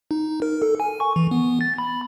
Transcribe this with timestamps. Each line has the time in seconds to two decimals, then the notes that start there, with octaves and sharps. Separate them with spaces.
0.11 D#4
0.42 A#4
0.62 A4
0.80 G#5
1.00 C#6
1.16 E3
1.31 B3
1.61 A6
1.78 B5